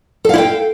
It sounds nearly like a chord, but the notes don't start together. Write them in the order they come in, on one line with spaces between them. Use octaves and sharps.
A4 F5 E4 G5